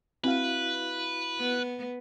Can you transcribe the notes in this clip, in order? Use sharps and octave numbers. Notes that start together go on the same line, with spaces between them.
C4 E4 F#4 B4 F5
B3